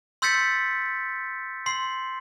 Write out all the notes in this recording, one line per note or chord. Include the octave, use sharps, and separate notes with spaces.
C6 E6 G6 A6 B6 C#7
C6 C7